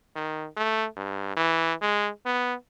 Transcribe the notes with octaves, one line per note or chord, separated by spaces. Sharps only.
D#3
A3
G2
E3
G#3
B3